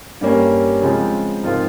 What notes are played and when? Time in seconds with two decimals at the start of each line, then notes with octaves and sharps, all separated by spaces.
0.21 G2 G3 A#3 C#4
0.82 C#3 F3 G#3 C4
1.43 G#2 F3 C4 F4 A#4